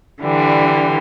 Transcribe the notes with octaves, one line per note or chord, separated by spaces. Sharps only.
D3 E3 G3